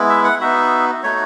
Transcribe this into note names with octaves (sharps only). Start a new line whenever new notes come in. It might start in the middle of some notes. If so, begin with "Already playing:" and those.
Already playing: G#3 B3 E4
E5
F#5
B3 D#4 F#4 E5
A3 D#4 F#4 C#5